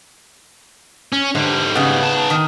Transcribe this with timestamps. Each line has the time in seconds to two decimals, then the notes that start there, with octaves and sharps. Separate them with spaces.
1.12 C#4
1.35 G#2 D3 G3
1.75 C#3 B3
2.03 D#4 A5
2.30 D#3